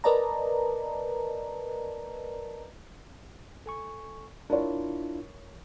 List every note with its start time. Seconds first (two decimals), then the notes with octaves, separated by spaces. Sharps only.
0.04 A#4 B4 D5 D#5 A5 A#5
3.66 A4 G#5 C#6
4.50 D4 E4 F4 A#4 C#5